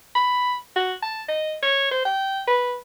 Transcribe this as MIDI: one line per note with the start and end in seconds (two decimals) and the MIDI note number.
0.15 0.54 83
0.76 0.93 66
1.03 1.23 81
1.29 1.56 75
1.63 1.86 73
1.91 2.05 72
2.05 2.42 79
2.48 2.75 71